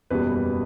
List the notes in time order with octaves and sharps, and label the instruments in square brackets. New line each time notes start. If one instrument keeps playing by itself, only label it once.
[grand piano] F#1 E2 B2 G3 B4